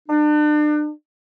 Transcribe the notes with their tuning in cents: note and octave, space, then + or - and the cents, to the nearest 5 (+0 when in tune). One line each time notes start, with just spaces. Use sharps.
D4 +35